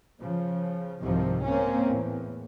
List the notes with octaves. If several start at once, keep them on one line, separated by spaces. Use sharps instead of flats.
C#3 F3
C2 G#2 C3 D#3 F3
A#3 C4 C#4
E2 A2